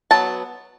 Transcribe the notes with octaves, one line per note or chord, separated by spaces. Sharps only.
F#3 B3 A5